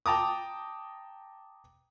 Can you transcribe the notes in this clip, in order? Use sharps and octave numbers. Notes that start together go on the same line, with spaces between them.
G5 A5 A#5 D6 D#6